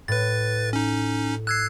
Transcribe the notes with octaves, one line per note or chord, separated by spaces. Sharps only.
A2 B4 A6
C#4 D#4
E6 F#6 G#6 C7